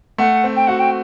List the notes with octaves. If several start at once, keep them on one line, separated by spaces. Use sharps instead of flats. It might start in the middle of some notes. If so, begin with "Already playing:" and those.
A3 F#5
C4
G5
F#4 F#5
G5